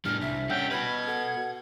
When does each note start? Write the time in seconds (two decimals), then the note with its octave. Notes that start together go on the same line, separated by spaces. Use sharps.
0.05 A2 G3 D4 F6
0.21 C2 E5 B6
0.50 G3 C#4 F#5 G5 E6 B6
0.71 F#4 B4 B5 F6 G#6
1.07 A4 F#5